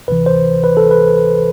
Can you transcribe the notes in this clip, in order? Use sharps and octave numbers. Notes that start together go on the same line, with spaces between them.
D2 C3 E3 B4
C5
B4
A4
B4